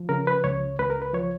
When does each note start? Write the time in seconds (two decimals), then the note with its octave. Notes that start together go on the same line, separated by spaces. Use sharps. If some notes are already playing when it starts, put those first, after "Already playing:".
Already playing: F3
0.09 C#3 A#4
0.27 B4
0.44 C#2 C#5
0.79 C#2 B4
0.90 A#4
1.02 B4
1.13 F3 C#5